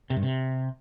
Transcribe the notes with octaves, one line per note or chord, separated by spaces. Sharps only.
C3
G2
C3